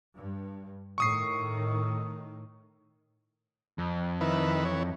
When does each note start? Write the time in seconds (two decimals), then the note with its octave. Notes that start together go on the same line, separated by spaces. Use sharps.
0.16 G2
0.98 A2 D#3 C#6 D#6 C7
3.78 F2
4.21 D#3 E4 B4
4.65 E3 C#5